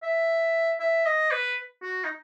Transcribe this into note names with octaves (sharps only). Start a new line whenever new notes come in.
E5
E5
D#5
B4
F#4
D#4